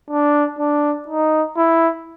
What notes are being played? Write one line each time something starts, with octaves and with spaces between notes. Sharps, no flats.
D4
D4
D#4
E4